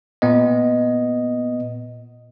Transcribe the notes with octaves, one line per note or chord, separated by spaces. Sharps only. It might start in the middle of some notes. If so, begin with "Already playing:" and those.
A#2 B3 D#5